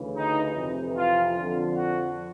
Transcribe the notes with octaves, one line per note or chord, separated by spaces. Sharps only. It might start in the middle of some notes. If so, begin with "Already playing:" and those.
Already playing: D2 C#3 E3
D#4
F2 C3 E3
F4
F2 D3 F3
F#4